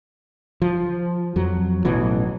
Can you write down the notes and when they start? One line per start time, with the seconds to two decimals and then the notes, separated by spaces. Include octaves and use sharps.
0.62 F3
1.36 F2 F#3
1.85 A1 B2 E3 F#3